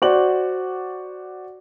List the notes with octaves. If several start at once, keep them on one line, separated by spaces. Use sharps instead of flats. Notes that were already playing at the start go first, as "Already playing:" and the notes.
F#4 C5 D5 F#5 F#7